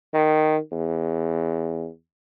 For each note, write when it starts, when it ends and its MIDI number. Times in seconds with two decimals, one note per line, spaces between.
0.13 0.57 51
0.72 1.87 40